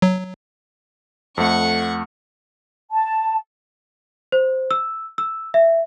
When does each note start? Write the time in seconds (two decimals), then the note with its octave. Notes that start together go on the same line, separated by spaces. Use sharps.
0.02 F#3
1.38 F2 A3 F#5 C#6
2.91 A5
4.32 C5
4.71 E6
5.18 E6
5.54 E5